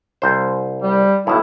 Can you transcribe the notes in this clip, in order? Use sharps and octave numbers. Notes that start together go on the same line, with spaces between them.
C2 C5
G3
B1 A2 E4